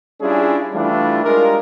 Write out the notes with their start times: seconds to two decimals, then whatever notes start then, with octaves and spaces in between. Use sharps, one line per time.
0.21 G3 C#4 D4 E4 F4 G#4
0.74 E3 G3 A3 D4 E4 F4
1.24 G3 G#3 D4 F4 A#4